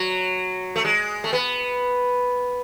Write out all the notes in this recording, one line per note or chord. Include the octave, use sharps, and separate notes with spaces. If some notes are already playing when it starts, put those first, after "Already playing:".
Already playing: F#3
A3
G#3
A3
B3